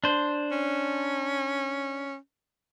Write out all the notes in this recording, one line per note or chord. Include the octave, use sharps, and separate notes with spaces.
D4 C5
C#4